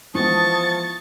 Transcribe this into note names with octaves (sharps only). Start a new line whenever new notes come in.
E3 F3 G#3 B3 A5 C#6 D#6 A6